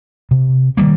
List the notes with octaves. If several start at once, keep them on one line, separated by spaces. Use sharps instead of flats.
C3
D#3 G3 A#3